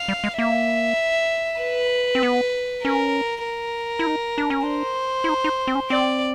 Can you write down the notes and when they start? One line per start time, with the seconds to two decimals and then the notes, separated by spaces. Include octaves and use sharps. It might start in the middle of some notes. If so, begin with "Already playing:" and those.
Already playing: F5
0.08 G3
0.24 G#3
0.39 A#3 E5
1.61 B4
2.15 C4
2.23 B3
2.84 C#4 A#4
3.45 A#4
3.99 E4
4.07 D#4
4.38 D4
4.50 C#4
4.63 D4 C5
5.24 E4
5.29 D#4
5.44 D#4
5.67 C4
5.75 C#4
5.90 C4 D5